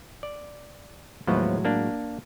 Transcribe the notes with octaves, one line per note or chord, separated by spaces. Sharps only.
D5
D#2 A2 F3 F#3 G#3 B3
A#3 D4